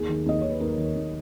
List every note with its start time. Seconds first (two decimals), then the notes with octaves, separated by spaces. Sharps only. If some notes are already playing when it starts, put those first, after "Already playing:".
Already playing: D#2 G#4
0.09 D#3
0.26 D#2 D#5
0.40 D#3 C#5
0.50 B4
0.60 D#2 A#4
0.77 D#3
0.83 A#4
0.95 D#2